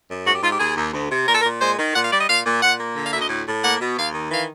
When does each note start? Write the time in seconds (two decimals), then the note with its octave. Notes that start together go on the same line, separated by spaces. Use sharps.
0.09 F#2
0.26 G#2 F#4
0.34 G4
0.43 G#2 F4
0.51 G4
0.59 D#2 G#4
0.76 D#2
0.93 D2
1.11 C3
1.27 A#2 A#4
1.34 A4
1.41 A#4
1.44 A#2
1.61 G#3 C5
1.78 D#3
1.95 A#2 F#5
2.04 F5
2.12 G3 D5
2.20 D#5
2.29 A#2 F5
2.45 A#2
2.62 A#2 F#5
2.79 A#3
2.96 D3
3.04 F5
3.13 D2 E5
3.21 D#5
3.30 A2
3.47 A2
3.63 A#3 F#5
3.80 B2
3.97 D#2 F5
4.14 D#3
4.31 E3 F5